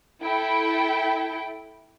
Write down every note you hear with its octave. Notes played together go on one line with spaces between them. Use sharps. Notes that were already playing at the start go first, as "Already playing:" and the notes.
E4 A4 G5